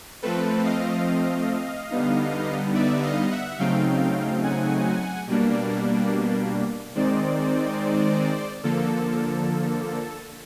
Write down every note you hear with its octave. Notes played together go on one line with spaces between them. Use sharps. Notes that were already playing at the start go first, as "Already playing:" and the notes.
F3 A3 C4 A4 B4
D#5 F5
D3 G3 B3 D#4
D5 E5
D#5 F5
E5 F#5
C#3 F#3 A3 C4 D#4 F5 G5
F#5 G#5
B2 G3 A#3 D4
D#3 G#3 C4 D#4 C5 D5
D3 F3 A#3 A4